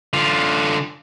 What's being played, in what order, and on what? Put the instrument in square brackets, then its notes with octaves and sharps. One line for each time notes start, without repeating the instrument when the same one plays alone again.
[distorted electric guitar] D3 F4